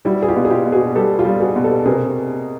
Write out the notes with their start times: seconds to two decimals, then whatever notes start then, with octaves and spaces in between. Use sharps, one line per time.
0.05 G3 E4 F#4
0.22 G#4
0.28 F4 G4
0.36 B2
0.45 G#4
0.50 F4 G4
0.65 B2
0.72 F#4 G#4
0.95 G3 G4 A4
1.19 F4 G4
1.25 G3
1.40 F#4 G#4
1.56 B2
1.64 G4 A4
1.86 C3 G#4 A#4